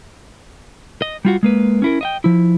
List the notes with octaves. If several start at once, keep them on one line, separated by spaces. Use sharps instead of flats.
D#5
G3 F4 F#4
G#3 A#3 B4
C#4 E4 A#4
D#5 E5 G5
F3 E4